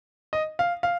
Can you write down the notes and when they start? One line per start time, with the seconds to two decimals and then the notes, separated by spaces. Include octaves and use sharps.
0.33 D#5
0.59 F5
0.83 F5